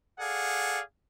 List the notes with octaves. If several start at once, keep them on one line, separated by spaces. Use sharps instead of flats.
G#4 A4 D5 F5 F#5